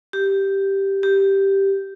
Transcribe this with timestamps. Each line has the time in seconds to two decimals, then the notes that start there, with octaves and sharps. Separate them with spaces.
0.13 G4
1.03 G4